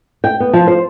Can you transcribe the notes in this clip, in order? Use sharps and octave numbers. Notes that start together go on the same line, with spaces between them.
G5
B3
F3
C5